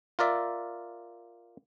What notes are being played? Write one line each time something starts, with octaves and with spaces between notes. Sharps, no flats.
F4 A#4 D5 E5